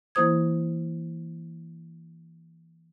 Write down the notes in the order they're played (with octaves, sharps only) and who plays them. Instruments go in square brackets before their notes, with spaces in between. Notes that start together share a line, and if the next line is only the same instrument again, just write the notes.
[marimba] E3 A#3 E4 C5 D#6 G#6